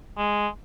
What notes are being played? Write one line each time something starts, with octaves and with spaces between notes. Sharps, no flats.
G#3